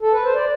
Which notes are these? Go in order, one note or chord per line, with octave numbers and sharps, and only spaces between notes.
A4
B4
C5
D5